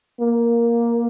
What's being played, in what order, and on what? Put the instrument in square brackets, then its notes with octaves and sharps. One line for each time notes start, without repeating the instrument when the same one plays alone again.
[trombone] A#3